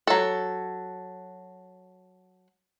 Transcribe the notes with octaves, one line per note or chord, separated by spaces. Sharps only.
F#3 A4